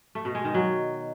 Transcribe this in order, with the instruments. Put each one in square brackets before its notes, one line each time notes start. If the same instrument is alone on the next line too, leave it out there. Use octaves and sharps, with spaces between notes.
[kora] A3
B2
G#3
D#3
F#3